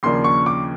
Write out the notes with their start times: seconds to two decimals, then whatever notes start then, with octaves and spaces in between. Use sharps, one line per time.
0.03 D#2 C#3 F3 A#3 D4 C6
0.24 C#6
0.46 D6